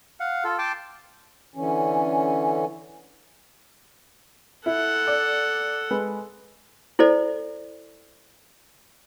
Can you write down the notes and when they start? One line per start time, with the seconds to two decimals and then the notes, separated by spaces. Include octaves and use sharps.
0.20 F5 F#5
0.44 F4 A4
0.59 G5 A5 C6 D6
1.55 D3 E3 C#4
4.66 E4 A4 F#5
5.07 D5
5.90 G#3 B4
6.99 E4 A4 C5 D5